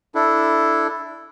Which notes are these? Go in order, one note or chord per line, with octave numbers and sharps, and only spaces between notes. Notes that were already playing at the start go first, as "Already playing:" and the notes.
D4 E4 A4